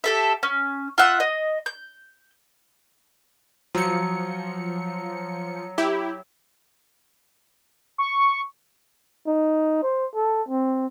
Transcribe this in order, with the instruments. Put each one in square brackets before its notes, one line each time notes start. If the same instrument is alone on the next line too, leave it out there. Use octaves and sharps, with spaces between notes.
[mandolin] G4 A4 E5
C#4
F4 E5 F#5 E6
D#5
G6
[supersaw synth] F3 C#7 [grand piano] F#3
[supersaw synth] E4 G4
[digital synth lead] C#6
[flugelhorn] D#4
C5
A4
C4